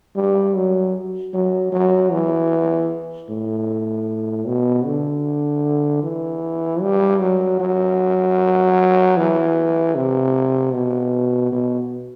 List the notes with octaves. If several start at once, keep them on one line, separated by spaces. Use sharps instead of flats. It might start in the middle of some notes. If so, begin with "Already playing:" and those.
G3
F#3
F#3
F#3
E3
A2
B2
D3
E3
G3
F#3
F#3
E3
C3
B2
B2